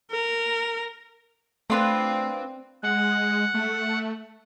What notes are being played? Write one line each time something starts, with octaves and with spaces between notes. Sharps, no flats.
A#4
A3 C4 D4 F4 B4
G#3 F#5
A3